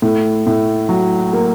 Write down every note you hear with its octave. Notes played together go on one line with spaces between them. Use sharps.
A2
A2
F#3
A#3